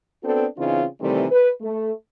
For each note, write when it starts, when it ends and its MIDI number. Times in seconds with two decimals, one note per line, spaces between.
0.23 0.45 59
0.23 0.45 60
0.23 0.45 62
0.23 0.45 66
0.23 0.45 69
0.57 0.84 49
0.57 0.84 52
0.57 0.84 60
0.57 0.84 62
0.57 0.84 63
0.57 0.84 65
1.00 1.24 48
1.00 1.24 51
1.00 1.24 52
1.00 1.24 55
1.00 1.24 57
1.00 1.24 60
1.30 1.50 71
1.61 1.91 57